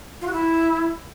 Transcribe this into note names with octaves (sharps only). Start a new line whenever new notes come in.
F4
F#4
E4